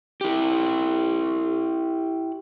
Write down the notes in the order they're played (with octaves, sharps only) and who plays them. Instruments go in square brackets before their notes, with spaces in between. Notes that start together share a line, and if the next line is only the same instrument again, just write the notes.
[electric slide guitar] E4 G4